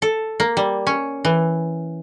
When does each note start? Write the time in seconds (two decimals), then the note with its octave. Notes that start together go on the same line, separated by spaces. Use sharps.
0.02 A4
0.40 A#3
0.57 G3
0.87 C#4
1.25 E3